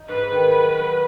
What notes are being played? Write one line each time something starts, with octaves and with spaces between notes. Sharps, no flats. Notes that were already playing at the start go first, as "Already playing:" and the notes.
Already playing: D#4
G#2 B4
D#3
F#3
F#3